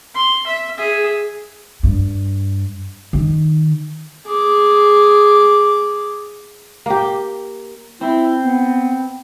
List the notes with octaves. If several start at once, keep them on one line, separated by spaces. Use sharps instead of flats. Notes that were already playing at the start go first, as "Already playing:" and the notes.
C6
E5
G#4 E5
G2
D#3
G#4 D6
A#3 G4
C4 E4
B3